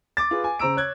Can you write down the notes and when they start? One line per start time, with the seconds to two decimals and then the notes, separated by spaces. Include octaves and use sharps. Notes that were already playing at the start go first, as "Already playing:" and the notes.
0.17 D6 A6
0.31 F4 G#4 B4
0.44 G#5
0.59 C#3 C5 A#5 E6 D7
0.76 C#5 F#6 G#6